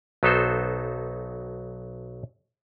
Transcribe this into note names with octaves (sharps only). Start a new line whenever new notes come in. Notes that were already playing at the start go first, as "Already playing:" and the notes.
B1 F#3 B3 D#4 A4 C5